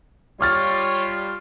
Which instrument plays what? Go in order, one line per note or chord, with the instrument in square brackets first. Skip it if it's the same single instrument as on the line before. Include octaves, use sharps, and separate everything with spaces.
[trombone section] G3 F4 [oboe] C#5 [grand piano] D6 F6 A6